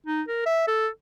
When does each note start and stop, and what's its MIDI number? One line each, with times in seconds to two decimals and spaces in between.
0.07 0.22 63
0.28 0.41 70
0.46 0.65 76
0.68 0.88 69